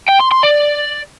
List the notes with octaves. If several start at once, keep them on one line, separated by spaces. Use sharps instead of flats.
G5
C6
C6
D5